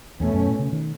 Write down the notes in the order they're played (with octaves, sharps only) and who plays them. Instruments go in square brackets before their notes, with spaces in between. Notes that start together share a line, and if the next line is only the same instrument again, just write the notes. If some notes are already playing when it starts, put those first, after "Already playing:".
[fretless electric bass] E2 [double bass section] B2 A3 C#4
[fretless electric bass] F#2
A2
C#3
D#3